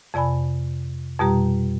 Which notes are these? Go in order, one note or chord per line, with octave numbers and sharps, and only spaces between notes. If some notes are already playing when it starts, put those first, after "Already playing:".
F2 C3 D5 G#5 B5
F2 B2 G3 G4 A#5